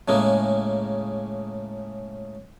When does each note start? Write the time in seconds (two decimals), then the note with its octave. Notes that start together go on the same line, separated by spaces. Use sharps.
0.08 A2 C#3 G#3 A#3